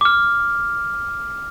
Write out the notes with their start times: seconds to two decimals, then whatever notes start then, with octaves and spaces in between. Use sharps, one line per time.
0.01 D6 F6